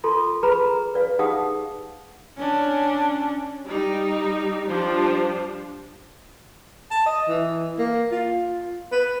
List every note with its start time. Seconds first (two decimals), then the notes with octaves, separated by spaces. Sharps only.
0.04 F4 A4 C6
0.43 G#4 B4 A#5 B5
0.94 B4 D5 F5
1.19 D#4 G4 G#4 F5 F#5 D#6
2.38 C#4 D4
3.66 G3 D#4
4.66 F3 G3 D4 F4 C5
6.91 A5
7.06 D#5
7.29 E3
7.79 A#3
8.12 F4
8.92 B4